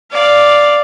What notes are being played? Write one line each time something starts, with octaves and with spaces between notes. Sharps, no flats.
D5 F5